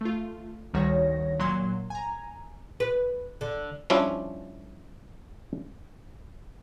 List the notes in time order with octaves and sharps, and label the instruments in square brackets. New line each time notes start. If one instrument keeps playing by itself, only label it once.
[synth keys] A3 F4
D2 D#3 G3 F#4 C#5 A#6
A#2 F#3 A#3 C6
G#5 A#5
[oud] B4
D3
[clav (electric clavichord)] F3 G3 C#4 D4 E4 F4